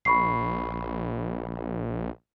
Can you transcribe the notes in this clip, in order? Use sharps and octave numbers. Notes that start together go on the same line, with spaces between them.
A#1 B5 C#6 C7